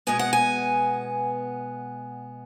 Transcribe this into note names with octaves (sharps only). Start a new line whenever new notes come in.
B2 G#3 B3 G#5
F#5
G#5